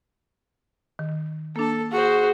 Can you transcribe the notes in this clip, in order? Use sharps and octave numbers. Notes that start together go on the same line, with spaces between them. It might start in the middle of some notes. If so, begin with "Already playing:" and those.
D#3
A#3 D4 A4 A5
F#4 G#4 C5